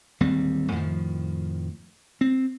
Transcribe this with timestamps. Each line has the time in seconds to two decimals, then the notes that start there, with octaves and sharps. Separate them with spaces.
0.20 D1 D#2 G3 C4
0.72 F2 A2 D#3 F3
2.21 C4